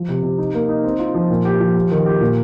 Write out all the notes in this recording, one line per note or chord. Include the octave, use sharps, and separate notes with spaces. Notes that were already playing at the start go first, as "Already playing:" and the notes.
Already playing: F3
C3
C3
D#4
A#3
D#4
C4
F4
F3
A#2
G4
F3
G4
D#3
G4
A#2